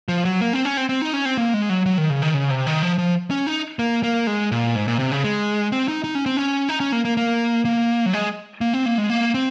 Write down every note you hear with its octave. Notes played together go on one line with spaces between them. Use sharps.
F3
F#3
A#3
C4
C#4
C4
C4
D#4
C#4
C4
A#3
G#3
F#3
F#3
D#3
C#3
D#3
C#3
C3
D#3
F3
F3
C#4
D#4
A#3
A#3
G#3
A#2
G#2
A#2
C3
C#3
G#3
C4
D#4
D#4
C#4
C4
C#4
D#4
C#4
A#3
A#3
A#3
A#3
F#3
G#3
A#3
C4
A#3
G#3
A#3
C4